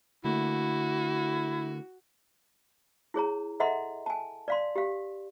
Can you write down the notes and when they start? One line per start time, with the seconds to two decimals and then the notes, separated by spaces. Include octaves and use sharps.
0.25 D3 A3 A#3 E4 F#4
3.14 E4 G#4 C#5 A#5
3.60 A4 D#5 E5 F#5 A#5 C6
4.06 G#5 A5
4.48 D5 F5 C6
4.76 G4 F5